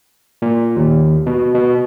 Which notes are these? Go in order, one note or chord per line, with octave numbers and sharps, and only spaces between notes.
A#2
D#2
B2
B2